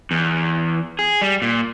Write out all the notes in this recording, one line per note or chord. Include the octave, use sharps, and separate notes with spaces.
E2
G#4
G3
A#2